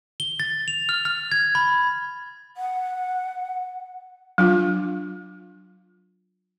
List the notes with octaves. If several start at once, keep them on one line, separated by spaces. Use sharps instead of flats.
G7
A6
F7
F6
F6
G#6
B5
F#5
F#3 D4 F4